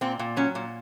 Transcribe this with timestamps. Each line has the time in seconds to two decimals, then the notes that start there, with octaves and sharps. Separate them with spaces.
0.01 A#2 C4
0.19 A#2
0.36 F#3 C#4
0.55 A#2